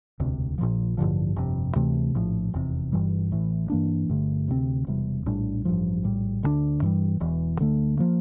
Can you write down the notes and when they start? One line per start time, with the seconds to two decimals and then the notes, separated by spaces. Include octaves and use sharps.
0.20 E1 D2 C3
0.58 A#1 A#2 F3
0.97 A1 G2 D3 F3
1.36 G1 F2 C3
1.75 D2 C3 E3 A3
2.15 A#1 A2 F3
2.53 F1 E2 C3
2.92 G1 G2 E3 G3
3.31 A1 A2 E3
3.70 G2 E3 A#3 D4
4.09 G1 G2 D3 A3
4.48 D2 C3 G3 C4
4.87 E1 E2 C3 G3
5.26 A#1 A2 G3 D4
5.65 A1 G2 F3
6.03 A#1 A2 G3
6.43 D2 D3 G3 D4
6.82 G2 E3 G3
7.20 E1 E2 E3
7.59 D2 D3 A3
7.99 F3 A#3